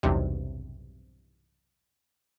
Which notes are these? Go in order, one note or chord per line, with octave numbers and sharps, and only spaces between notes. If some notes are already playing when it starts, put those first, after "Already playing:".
B1 E2 G2 C3